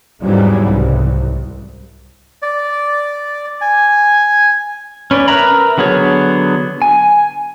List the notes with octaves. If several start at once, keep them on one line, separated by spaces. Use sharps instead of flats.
E2 G#2 C#3 E3 F#3 G3
C2
D5
G#5
C#4 B4 D5
A#4 B4 E5 A#5 B5
D3 F#3 B3 G#4 C#5
G#5